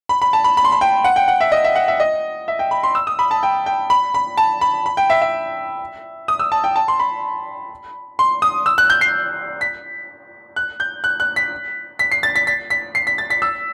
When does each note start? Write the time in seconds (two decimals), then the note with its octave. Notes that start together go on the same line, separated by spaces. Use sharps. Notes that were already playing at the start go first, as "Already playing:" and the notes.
0.09 B5
0.22 B5
0.33 A5
0.44 B5
0.57 B5
0.65 C6
0.72 B5
0.81 G5
1.04 F#5
1.16 G5
1.28 F#5
1.41 E5
1.52 D#5
1.64 E5
1.76 F#5
1.88 E5
2.00 D#5
2.48 E5
2.59 G5
2.71 B5
2.83 C6
2.95 E6
3.07 D#6
3.19 B5
3.31 A5
3.43 G5
3.66 G5
3.90 B5
4.14 B5
4.37 A5
4.61 B5
4.86 B5
4.97 G5
5.10 E5
5.22 E5
6.28 D#6
6.39 E6
6.52 A5
6.64 G5
6.76 A5
6.88 C6
7.00 B5
8.19 C6
8.42 D#6
8.66 E6
8.78 F#6
8.90 G6
9.01 C7
9.61 B6
10.56 F#6
10.80 G6
11.04 F#6
11.20 F#6
11.36 B6
11.99 B6
12.12 C7
12.23 A6
12.35 B6
12.47 B6
12.70 B6
12.95 C7
13.07 B6
13.18 A6
13.30 B6
13.42 E6